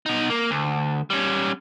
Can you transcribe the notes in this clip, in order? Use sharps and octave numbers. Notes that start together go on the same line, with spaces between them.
B2 D#4
A#3
D2
G3 C#4